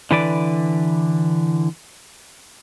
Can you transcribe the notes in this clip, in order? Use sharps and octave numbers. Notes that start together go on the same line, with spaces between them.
D3 E3 B4 D5